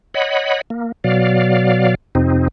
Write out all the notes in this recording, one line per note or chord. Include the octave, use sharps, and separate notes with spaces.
C#5 D#5 F#5 B5
A#3
B2 F#3 D5 F5
F2 C3 C4 D#4